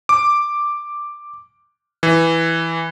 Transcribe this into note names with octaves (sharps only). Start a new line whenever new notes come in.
D6
E3